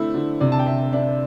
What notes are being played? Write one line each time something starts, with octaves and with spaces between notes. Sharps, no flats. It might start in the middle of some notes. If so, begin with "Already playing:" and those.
Already playing: D3 A3 C4 E4
D3
C3 D5
A5
G5
C3 E5
D4 E5